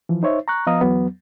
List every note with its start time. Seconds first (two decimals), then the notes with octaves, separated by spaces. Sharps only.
0.09 E3 F3
0.23 D#4 C5 C#5 E5
0.48 A#5 C#6 F#6
0.66 F3 B3 D#5 F5 A#5 D#6
0.81 E2 F#3 B3